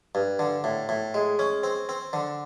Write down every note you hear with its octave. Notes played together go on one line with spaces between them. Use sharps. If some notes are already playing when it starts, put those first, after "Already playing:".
G2
D3
A2
A2
G#3
C#4
C4
C4
D3